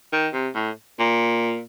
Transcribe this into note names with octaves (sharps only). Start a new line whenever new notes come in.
D#3
C3
A2
A#2